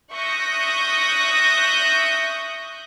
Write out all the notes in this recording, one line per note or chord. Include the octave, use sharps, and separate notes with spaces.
E5 C#6 D#6 F#6 G6 A#6